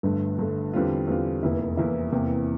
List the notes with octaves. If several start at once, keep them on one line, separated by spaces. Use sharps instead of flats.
G1 G2 D3 A3
G1 G2 D3 A3
E2 D3 G3 C4 F4
E2 D3 G3 C4 F4
F1 E2 E3 A#3 E4
F1 E2 E3 A#3 E4
E2 C3 E3 A#3